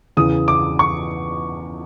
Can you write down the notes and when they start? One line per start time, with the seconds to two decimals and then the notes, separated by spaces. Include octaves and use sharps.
0.17 E2 C#3 E3 D#6
0.48 D6
0.79 C#6